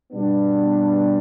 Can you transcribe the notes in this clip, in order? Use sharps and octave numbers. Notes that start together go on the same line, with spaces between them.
B2 G3 B3 D4